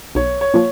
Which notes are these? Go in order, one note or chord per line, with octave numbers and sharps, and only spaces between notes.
B1 C#5
C#5
A#2 F3